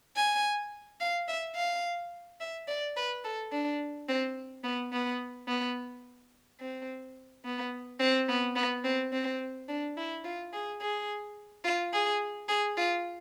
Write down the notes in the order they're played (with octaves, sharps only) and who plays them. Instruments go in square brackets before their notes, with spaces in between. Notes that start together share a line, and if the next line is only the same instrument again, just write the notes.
[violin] G#5
F5
E5
F5
E5
D5
B4
A4
D4
C4
B3
B3
B3
C4
B3
C4
B3
B3
C4
C4
D4
E4
F4
G#4
G#4
F4
G#4
G#4
F4